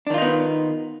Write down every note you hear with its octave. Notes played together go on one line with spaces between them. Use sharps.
D#3 B3 D4 D#4 F4